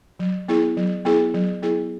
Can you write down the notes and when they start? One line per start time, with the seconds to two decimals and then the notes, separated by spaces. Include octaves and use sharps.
0.19 F#3
0.48 B3 E4 G#4
0.77 F#3
1.05 B3 E4 G#4
1.34 F#3
1.62 B3 E4 G#4